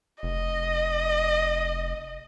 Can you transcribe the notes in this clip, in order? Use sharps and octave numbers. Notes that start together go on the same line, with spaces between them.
F1 D#5